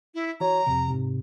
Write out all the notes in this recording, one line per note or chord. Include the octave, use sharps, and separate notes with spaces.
E4
E3 F#4 C#5 A#5
F2 C3
G#2 C3